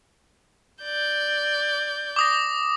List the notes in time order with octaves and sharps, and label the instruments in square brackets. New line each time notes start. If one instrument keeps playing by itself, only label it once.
[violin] D5 G6
[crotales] D6 D#6 A#6